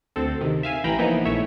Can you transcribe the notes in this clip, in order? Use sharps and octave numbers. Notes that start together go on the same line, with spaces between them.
D2 C4 A4
C3 D#3
E5 F5 G#5
A1 E3 G5 A#5 B5
E3 F3 A#3 B3 D#4 E4
A#1 A3 C#5 E5